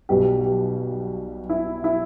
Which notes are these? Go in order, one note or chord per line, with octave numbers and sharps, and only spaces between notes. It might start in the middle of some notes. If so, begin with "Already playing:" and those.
B1 B2 G3 G4
G4
E4
E4